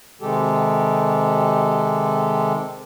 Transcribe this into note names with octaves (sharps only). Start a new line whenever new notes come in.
C3 D#3 G#3 G4 A4